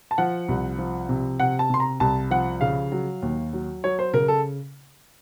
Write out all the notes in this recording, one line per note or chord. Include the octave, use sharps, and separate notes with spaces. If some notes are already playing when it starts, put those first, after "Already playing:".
A5
F3 F#5
C2
F3
C3
C3 F#5
A5
C3 C6
A#5
C2 A5
F3 F#5
C#3 F5
F#3
D#2
F#3
F#3 C#5
C5
C#3 A#4
A4